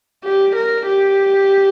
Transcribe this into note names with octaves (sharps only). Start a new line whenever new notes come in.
G4
A#4
G4